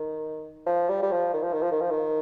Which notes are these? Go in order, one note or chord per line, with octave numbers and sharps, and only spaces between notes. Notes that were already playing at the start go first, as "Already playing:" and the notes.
Already playing: D#3
F3
G3
G3
F3
D#3
F3
D#3
F3
D#3
F3
D#3